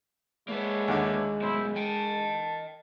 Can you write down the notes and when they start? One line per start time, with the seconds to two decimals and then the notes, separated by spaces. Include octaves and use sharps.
0.48 G#3 A#3 D4 E4 B4 C#5
0.88 D#2 D3
1.42 F#2 B2 E4 C5
1.76 D#5 G5 A5